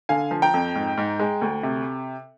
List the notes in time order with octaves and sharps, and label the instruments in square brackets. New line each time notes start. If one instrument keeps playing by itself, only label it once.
[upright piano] D3 F5 G#5
F3
G5 A#5
F2
G#2
G#2
G#3
D2
C3